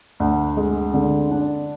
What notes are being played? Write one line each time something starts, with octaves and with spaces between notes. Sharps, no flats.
D2
G#3
D3
D4